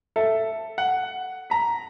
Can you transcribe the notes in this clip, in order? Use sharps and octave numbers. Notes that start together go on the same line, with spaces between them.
A4 E5
F#5
A#5 B6